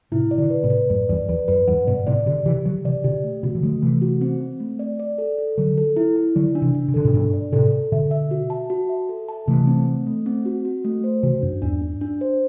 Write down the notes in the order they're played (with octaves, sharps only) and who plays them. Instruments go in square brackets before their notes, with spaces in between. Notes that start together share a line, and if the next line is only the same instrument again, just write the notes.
[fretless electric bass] A2 C3 [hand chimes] E4
[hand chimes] D5
[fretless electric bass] B2 D3
[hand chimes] B4
[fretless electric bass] A2 C3
[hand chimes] B4
[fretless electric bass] F#2 A2 [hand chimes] D5
[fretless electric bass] E2 G2 [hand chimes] D5
[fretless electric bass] E2 [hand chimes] B4
[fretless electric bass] F#2 [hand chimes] B4
[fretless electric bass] E2 G2 [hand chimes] F#5
[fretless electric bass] G2 B2 [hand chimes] D5
[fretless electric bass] A2 C3 [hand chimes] D5
[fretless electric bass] B2 D3 [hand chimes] G4
[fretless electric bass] C3 E3 [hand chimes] G4
[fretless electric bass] D3 F#3 [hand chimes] G4
[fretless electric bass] C3 E3 [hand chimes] D5
[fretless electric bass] B2 D3 [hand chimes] G4
[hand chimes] A3
[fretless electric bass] B2 D3 [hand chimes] F#4
[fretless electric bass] E3
[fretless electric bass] D3 F#3 [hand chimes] A3
[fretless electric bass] C3 E3 [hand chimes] A3
[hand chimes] F#4
C4
C4
A3
D5
D5
A4
A4
[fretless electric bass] D3 F#3 [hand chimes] A4
[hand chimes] A4
E4
E4
[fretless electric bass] D3 F#3 [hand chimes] D5
[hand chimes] D4
[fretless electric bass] C3 E3
[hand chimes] D4
[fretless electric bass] C3
[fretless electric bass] D3 [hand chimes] A4
[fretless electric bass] A2 C3
[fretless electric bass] G2 B2 [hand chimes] D4
[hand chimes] D5
[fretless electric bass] A2 C3 [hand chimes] A4
[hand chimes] A4
[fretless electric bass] B2 D3 [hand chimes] E5
[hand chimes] E5
F#4
A5
F#4
E5
A4
A5
[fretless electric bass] C3 E3 [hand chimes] A3
[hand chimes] C4
A3
A3
C4
F#4
F#4
A3
C5
[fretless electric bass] C3 E3 [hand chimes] F#4
[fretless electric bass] F#2 [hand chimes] D4
[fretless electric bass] E2 G2 [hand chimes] D4
[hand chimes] D4
D4
C5